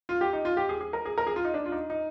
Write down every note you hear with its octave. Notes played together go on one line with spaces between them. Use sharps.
F4
G4
D#4
F4
G4
G#4
G#4
A#4
G#4
A#4
G#4
F4
D#4
D4
F4
D#4
D#4